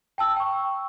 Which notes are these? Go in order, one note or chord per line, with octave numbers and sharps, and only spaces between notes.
G5 A5 E6
G5 C#6